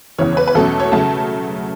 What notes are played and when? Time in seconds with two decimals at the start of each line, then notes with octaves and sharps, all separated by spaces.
0.18 E2 C#3 E3 C#5
0.33 C#5
0.37 B4
0.48 B4
0.55 E2 B2 F#3 A3 C#4 A4
0.80 C#5
0.92 C#3 F#3 A3 A5